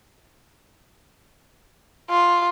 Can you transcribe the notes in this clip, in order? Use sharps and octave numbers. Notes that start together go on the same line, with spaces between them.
F4